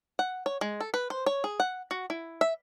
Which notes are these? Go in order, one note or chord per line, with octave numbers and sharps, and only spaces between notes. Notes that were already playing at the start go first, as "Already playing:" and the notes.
F#5
C#5
G#3
A4
B4
C5
C#5
G#4
F#5
F#4
E4
E5